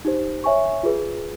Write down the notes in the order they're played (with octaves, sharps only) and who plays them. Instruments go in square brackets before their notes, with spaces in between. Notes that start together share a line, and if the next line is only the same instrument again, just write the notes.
[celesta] D#4 G4 C5
C#5 E5 G#5 C#6
F4 G#4 B4